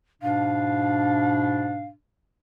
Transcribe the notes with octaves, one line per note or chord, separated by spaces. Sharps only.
G#2 B2 D4 F5